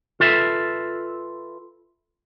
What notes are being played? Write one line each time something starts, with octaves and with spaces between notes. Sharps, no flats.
F4 A4 B4 E5